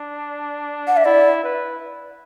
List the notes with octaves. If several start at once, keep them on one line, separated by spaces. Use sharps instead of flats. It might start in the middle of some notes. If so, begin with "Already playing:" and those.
Already playing: D4
F#5
E5
E4 D5
B4